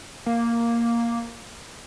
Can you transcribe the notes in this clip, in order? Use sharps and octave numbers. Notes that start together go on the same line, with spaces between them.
A#3